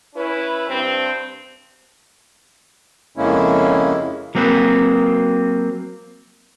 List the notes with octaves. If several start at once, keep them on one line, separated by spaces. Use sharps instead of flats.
C#4 E4 B4
G2 C4
F2 C#3 G#3 A#3 C#4 E4
F#3 A#3 C4 G#4 B4